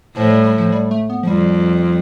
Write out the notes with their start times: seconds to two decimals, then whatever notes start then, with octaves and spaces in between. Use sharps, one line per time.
0.16 A2 F3
0.30 G3
0.44 G3
0.58 F3
0.72 G3
0.91 A3
1.10 B3
1.23 F3
1.27 F2 G3